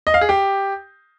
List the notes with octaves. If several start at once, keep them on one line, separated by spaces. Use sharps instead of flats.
D#5
F5
G#4
G4